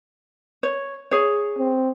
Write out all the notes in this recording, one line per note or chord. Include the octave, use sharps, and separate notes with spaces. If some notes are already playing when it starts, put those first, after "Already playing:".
C#5
G#4 C#5
C4